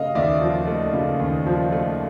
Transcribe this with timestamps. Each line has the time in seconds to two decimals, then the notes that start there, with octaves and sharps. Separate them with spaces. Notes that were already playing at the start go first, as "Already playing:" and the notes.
Already playing: C#3 A3 D#5 F5
0.15 D#2 D5 E5
0.41 F3
0.67 A3
0.93 C#3
1.20 D#2
1.46 F3
1.72 A3